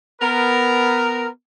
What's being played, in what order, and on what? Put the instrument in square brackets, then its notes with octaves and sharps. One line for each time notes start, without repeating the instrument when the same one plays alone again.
[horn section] B3 A#4